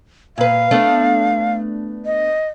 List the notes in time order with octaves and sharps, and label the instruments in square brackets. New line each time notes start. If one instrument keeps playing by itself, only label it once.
[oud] A#2 B4 [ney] F5
[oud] A3 B3 D4
[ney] D#5